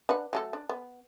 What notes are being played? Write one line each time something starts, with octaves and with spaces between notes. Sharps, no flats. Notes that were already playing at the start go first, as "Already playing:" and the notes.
D4 B4 F#5
F#3 A3 A4
D4
B3